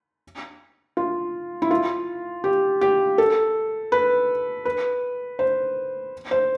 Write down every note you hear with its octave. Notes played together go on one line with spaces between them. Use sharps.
F4
E4
F4
G4
G4
A4
B4
B4
C5
C5